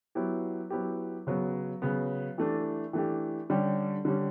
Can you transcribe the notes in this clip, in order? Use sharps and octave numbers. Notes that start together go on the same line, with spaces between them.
F#3 B3 E4 G4
F#3 B3 E4 G4
C#3 F#3 B3
C#3 F#3 B3
E3 A3 D4 G4
E3 A3 D4 G4
D3 G3 C#4 G4
D3 G3 C#4 G4